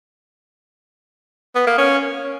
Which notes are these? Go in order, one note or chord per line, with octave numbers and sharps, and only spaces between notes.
B3
A#3
C#4